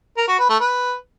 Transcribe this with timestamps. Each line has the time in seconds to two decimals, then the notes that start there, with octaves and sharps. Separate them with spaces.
0.17 A#4
0.28 F#4
0.39 B4
0.49 A3
0.60 B4